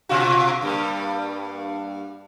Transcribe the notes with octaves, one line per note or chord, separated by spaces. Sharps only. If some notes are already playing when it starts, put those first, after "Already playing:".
B2 F4 F#4
G2 G3 A#3